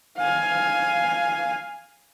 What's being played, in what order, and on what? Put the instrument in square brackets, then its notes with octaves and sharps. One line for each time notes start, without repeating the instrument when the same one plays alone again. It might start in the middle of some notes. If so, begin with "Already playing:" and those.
[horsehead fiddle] F5 G#5